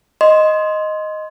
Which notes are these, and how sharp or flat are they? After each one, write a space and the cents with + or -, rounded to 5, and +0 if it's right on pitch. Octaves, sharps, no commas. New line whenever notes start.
D#5 +0 C6 +0